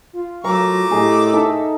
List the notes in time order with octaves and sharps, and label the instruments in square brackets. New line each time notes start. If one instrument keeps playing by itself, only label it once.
[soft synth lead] F4
[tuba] F#3 [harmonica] A3 D6 [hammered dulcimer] A#4 F5 A#5
[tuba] A2 [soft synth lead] G4 [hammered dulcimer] G#4 D#5
[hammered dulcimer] D#4 A4 E5 [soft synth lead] E6